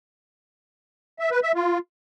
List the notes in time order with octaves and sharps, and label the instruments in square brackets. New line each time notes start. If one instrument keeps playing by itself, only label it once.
[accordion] E5
B4
E5
F4